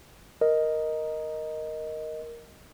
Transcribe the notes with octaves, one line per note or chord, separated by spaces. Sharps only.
A#4 D#5